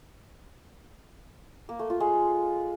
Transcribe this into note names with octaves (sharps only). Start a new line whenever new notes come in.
A#3
A3
F4
G#3